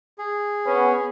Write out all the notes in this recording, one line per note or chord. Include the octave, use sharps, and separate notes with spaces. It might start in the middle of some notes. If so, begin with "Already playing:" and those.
G#4
B3 C#4